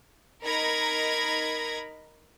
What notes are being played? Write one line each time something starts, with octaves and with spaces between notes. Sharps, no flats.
D#4 A#4 A#5 B5 G#6 A#6